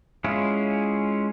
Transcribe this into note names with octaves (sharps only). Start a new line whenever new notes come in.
G#3 C#4 E4 F4 G#4